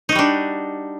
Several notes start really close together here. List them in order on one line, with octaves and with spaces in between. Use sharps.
D#4 F#4 G3 D4